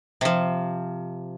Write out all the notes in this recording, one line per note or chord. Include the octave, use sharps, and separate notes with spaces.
C3 F3